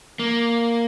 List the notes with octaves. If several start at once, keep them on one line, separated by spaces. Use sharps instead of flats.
A#3